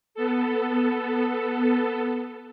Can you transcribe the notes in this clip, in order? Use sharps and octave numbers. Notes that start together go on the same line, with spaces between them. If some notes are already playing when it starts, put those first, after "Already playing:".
B3 A4